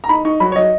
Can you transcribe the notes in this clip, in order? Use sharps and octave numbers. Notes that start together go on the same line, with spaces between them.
A#5
D#4 B5
D#4 C#6
F#3 B5
C#5
F#3 D#5